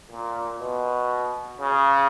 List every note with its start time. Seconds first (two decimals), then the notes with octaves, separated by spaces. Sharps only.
0.11 A#2
0.61 B2
1.61 C#3